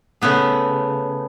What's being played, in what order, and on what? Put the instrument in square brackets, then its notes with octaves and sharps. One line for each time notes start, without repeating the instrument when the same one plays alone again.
[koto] C#3 A3 B3 G#4